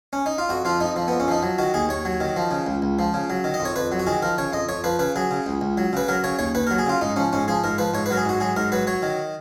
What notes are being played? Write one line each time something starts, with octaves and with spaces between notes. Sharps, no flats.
C#4
D#4
F4
F2 F#4
F3 F4
F2 D#4
F3
B3
F2
C#4
F3 D#4
F#3
D#3 F#4
D#2 G#4
D#2 C#5
F#3
D#3
F3
C#3
C#2
C#2
F3
C#3
F#3
D#3
D#5
F2
C#5
F2 B4
F#3
F#4
D#3 G#4
F3 A#4
C#3 C#5
F2 D#5
F2 C#5
F3 B4
C#3 B4
F#3 G#4
C#3
C#2
C#2
F#3
C#3 B4
F#3 A#4
C#3 C#5
D#2 C#5
D#2 B4
A#4
F#3
G#4
C#3 F4
G#2 D#4
F3 C#4
G#2 C#4
F3 G#4
G#2 A#4
F3 B4
G#2 C#5
B4
F#3 A#4
G#4
G#2 F#4
F#3 G#4
G#2 A#4
F#3 B4
F#3 C#5
D#3